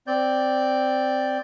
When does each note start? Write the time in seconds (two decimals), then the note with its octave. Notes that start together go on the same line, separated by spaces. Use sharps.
0.07 C4 D5 G6